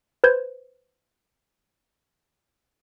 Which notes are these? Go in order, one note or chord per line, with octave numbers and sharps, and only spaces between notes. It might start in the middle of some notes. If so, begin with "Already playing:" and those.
B4 C5 G6 G#6